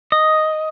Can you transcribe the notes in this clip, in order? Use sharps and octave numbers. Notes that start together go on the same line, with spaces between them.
D#5